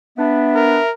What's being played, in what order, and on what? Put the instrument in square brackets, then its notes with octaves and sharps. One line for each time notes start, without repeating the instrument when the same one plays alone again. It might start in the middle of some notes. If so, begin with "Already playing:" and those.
[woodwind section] B3 D4 [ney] E5
[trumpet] A#4